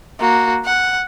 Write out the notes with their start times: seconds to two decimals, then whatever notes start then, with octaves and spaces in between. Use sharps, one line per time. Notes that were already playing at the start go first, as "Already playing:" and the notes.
0.20 A#3 F#4
0.65 F#5